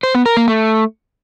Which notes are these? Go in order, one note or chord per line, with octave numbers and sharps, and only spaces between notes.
C5
B3
A#4
A#3
A3